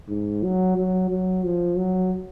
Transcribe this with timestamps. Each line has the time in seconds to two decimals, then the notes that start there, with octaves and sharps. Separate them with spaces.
0.09 G#2
0.43 F#3
0.77 F#3
1.10 F#3
1.44 F3
1.77 F#3